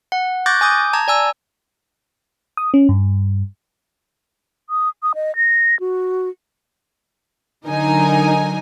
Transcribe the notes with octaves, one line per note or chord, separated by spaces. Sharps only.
F#5
C#6 D6 F#6 G6 A6 A#6
G#5 D6 D#6 G6
A5 A#5 G#6
D5 G#5 E6
D#6
C#4
G2
D#6
D#6
D#5
A#6
F#4
D3 F#3 D#4 A#4 D#5 G#5